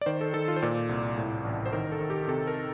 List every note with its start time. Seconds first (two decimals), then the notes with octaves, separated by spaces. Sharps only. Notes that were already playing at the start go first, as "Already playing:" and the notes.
0.01 D5
0.06 D#3 C5
0.21 A4
0.34 D#3 A4
0.48 F4
0.56 C5
0.62 A#2 D5
0.89 C2
1.18 A2
1.45 A1
1.66 C5
1.73 D#3 A#4
1.92 A4
2.01 D#3
2.10 G4
2.28 C3 A4
2.47 A#4